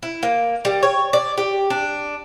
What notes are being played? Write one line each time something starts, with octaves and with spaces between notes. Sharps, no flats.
E4
A#3
G3
C#5
D5
G4
D4